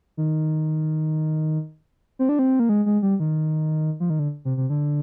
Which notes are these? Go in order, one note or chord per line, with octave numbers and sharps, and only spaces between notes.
D#3
C4
D4
C4
A#3
G#3
G#3
G3
D#3
F3
D#3
D3
C3
C3
D3